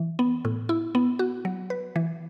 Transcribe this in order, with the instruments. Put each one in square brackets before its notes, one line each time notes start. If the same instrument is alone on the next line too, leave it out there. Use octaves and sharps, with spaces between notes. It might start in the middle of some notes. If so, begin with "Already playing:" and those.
Already playing: [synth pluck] E3
B3
A2
E4
B3
F#4
F#3
B4
E3